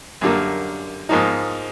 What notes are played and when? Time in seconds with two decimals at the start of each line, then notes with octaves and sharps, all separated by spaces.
0.21 F#2 D3 G3 A#3
1.09 G#2 F3 A#3 D#4